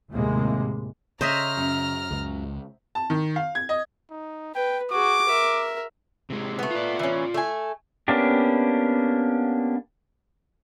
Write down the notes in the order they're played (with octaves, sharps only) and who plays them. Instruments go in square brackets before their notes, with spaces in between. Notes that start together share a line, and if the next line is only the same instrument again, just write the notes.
[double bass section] D#2 A2 C3 G#3 A#3
[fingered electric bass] C#3 [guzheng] C5 D#5 E5 [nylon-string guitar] C#5 [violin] A#5 F6
[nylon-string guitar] F#2
[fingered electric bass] C#2 C#3
[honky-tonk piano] A5
D#3
F5
G#6
D#5
[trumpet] D#4
[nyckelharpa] B4 [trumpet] G5
[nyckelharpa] F#4 G#4 [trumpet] D6
[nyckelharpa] A#4 E5
[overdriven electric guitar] C3 G#3
[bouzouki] A3 B3
[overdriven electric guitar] F4 D5
[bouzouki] E3 C#4
A3 G#5
[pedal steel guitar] A#3 B3 C#4 D4 G4